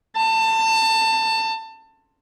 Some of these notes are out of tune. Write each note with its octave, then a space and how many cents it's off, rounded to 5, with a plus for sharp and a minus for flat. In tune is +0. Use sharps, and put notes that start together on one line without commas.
A5 +25